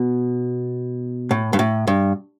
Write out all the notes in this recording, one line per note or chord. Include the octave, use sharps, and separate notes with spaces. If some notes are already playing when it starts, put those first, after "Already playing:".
Already playing: B2
A2
G2
A2
G2